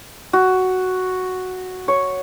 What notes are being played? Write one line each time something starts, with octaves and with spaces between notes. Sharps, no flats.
F#4
C#5